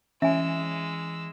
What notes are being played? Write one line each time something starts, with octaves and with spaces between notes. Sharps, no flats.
E3 G#3 C#4 E5 G#5 E6